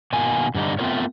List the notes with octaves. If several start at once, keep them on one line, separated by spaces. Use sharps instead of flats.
B2 D#3 A#3 G#5
G2 D3 G3 D#4
A3 B3 C4 F4 A#4 C#5